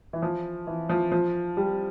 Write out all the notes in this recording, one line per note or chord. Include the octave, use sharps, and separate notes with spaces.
E3
F3
E3
F3
F3
G3